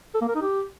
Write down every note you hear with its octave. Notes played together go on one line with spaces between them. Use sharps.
A4
A#3
A#4
D#4
G4